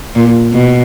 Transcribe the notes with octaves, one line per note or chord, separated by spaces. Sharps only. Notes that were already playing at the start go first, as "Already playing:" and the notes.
A#2
B2